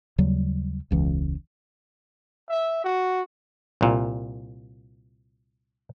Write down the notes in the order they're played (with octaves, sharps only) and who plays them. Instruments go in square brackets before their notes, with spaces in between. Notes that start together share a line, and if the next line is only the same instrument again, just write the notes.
[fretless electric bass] D#2 C#3 F#3 G3
E1 C#2 E3
[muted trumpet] E5
F#4
[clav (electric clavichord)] C2 A#2